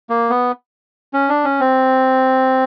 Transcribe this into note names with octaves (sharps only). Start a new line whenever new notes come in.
A#3
B3
C#4
D4
C#4
C4